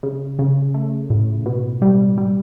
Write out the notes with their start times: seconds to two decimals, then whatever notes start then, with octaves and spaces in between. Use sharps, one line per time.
0.03 C#3
0.39 C#3
0.74 A3
1.10 A2
1.46 B2
1.82 G3
2.18 G3